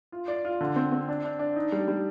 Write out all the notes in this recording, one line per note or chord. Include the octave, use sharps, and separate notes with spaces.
F4
D5
F4
D3
C4
C4
D4
D4
D4
D#4
G3
G3